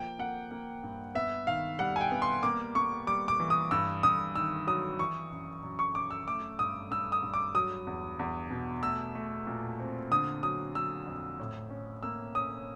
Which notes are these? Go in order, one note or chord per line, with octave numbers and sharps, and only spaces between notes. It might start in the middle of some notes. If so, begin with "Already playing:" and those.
Already playing: F3 A#3 G5
A#3 F#5
A#3
G2
B3 E5
D#3 F5
G3 F#5
G#5
G5
B3
C6
A#3 D6
A#3 C#6
G3 D6
D6
E3
D#6
G2 E6
G2 D#6
D#3 E6
F#3 D#6
E3 C#6
F#2
F#2
C#6
F#2 D6
E6
A3 D6
G2 D#6
G2 E6
D#6
G2
D6
F#3 D#6
E2
E2
B2
A3 E6
A3
A#2
C4
D3 D#6
F#3 D#6
F#3 E6
F2
A2
C#4
A#3 E6
C#4 D#6